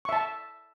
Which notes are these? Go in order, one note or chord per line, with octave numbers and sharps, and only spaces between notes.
E5 A5 C#6